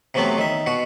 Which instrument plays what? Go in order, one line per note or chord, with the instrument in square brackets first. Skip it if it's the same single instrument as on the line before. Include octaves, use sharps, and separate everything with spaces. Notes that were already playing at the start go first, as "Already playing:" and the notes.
[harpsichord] C3 E3 F#3 A3 B3 C4
D#3 E5
B2 F#4